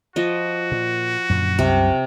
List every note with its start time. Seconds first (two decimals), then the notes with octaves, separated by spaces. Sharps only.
0.16 F3 F#4 D#5
0.72 A#2
1.30 F#2 A#2 D3
1.59 C2 F#2 C3